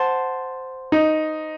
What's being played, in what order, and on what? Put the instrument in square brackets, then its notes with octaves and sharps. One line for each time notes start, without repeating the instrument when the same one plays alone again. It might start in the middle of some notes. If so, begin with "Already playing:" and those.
Already playing: [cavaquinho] C5 F#5 A5
[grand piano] D#4